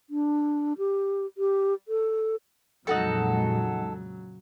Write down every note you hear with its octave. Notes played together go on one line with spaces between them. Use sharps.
D4
G4
G4
A4
F2 A#2 C#3 F#3 G#3 D#4 F#4 A4